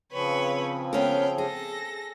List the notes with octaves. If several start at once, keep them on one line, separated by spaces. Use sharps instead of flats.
C#3 F3 C4 B4 C#5
B3 C#4 A#4 F5 G5
G#4 A4 A#6